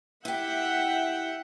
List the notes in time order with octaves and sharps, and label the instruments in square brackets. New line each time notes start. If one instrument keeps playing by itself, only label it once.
[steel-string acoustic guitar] E4 G4 [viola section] E5 F#5 G5